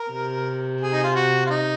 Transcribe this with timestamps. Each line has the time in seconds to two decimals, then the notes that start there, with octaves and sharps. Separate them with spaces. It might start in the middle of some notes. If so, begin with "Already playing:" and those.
Already playing: A#4
0.11 C3
0.81 G#4
0.93 D#4
1.04 F4
1.15 F#4
1.46 F4
1.50 D#4